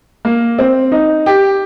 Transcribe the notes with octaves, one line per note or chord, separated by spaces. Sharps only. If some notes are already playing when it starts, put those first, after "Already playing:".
A#3
C4
D#4
G4